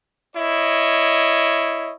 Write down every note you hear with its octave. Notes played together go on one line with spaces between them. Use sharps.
E4 C#5 D#5